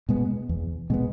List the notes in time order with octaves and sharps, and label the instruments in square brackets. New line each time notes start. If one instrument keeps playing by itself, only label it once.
[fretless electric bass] B2 G#3 B3
E2
B2 G#3 B3